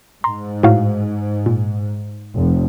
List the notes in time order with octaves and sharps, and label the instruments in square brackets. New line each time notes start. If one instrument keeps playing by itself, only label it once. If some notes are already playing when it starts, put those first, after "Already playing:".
[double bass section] G#2 [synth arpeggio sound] A#5 C6
[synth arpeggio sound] A2 F#4 F5
A#2
[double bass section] F1